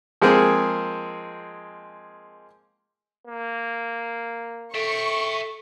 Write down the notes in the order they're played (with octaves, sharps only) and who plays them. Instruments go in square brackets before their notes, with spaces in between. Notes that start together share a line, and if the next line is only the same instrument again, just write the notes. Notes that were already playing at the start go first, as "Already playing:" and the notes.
[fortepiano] F3 G#3 A#3 C4 G#4
[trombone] A#3
[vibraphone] A4 [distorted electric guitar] E5 G5 [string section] C#6